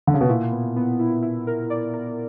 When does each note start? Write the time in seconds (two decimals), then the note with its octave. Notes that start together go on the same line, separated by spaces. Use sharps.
0.07 D3
0.14 C#3
0.21 B2
0.28 A#2 E4
0.52 B3
0.76 B3
1.00 E4
1.23 E4
1.47 A#4
1.70 D5
1.94 A#4